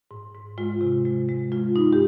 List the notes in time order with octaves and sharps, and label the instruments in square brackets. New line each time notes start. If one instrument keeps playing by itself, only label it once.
[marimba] G#2
G#2
G#3 F4
C3
G#3
G#3
G#3 F4
G2 D#4
G4